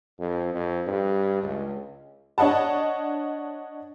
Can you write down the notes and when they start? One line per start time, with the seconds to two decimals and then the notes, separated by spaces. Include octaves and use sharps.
0.19 F2
0.54 F2
0.87 G2
1.43 C#2
2.38 D4 C#5 D#5 F#5 A5